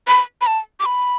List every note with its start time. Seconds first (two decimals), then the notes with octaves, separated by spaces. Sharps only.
0.08 B5
0.41 B5
0.47 A5
0.80 D6
0.86 B5